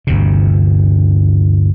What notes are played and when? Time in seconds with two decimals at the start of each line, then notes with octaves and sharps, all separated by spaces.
0.07 G1 D2 C3